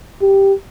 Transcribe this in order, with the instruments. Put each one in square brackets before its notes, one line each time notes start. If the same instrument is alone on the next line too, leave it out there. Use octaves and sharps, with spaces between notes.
[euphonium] G4